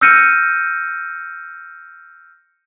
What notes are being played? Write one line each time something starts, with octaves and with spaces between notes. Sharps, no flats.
E6 F6 G6 A#6 C#7 D#7